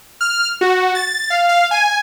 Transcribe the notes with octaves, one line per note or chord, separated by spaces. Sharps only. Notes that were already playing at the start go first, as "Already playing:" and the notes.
F6
F#4
A6
F5
F5
G#5